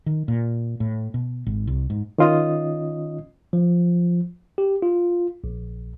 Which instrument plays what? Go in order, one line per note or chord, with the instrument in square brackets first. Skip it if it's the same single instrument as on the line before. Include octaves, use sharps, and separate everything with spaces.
[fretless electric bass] D#3
A#2
A2
B2
G#1
C2
G#2
[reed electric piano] D#3 C#4 F4 D#5 D#6
[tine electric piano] F3
G4
F4
A#1